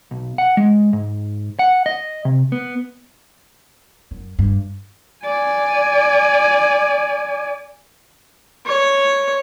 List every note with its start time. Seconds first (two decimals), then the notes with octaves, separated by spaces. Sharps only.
0.11 B1
0.38 F#5
0.57 G#3
0.93 G#2
1.59 F#5
1.86 D#5
2.25 C3
2.52 B3
4.11 F#2
4.39 G2
5.25 D5 G#5
8.67 C#5